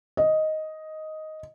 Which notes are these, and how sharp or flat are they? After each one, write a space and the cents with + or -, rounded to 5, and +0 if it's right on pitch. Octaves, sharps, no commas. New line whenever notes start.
D#5 +5